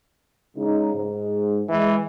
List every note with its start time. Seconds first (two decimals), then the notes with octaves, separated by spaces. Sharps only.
0.56 C#3 G#3 D#4
0.94 G#2
1.69 E3 G#3